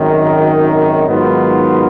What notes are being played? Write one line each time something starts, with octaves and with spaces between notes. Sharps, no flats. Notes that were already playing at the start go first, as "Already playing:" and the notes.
Already playing: G#1 F#2 D#3
G#2 D#3 F#3 B3 F4